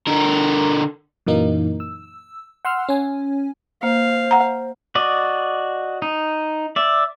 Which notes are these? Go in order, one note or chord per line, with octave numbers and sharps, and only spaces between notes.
D3 A#4
F#2 A#2 E3 F#3 A#3 D#4
E6
F#5 C6 E6 F6
C#4 G#5
A#3 C5 F5
F#5 A#5
F#4 D5 D#5
D#4
D5 E5